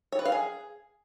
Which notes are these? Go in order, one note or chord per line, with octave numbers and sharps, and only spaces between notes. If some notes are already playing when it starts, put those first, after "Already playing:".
C#5
B4
F5
G#4